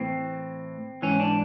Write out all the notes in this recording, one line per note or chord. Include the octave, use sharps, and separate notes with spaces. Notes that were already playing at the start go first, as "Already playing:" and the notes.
Already playing: A2 E3 C4
G#2 E3 C#4
D4